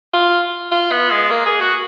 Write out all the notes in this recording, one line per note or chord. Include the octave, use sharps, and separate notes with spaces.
F4
F4
B3
G#3
A#3
G#4
F#4